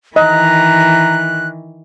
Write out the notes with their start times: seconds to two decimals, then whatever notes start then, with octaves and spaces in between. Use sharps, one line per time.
0.16 D#3 E3 D#5 A#5 F#6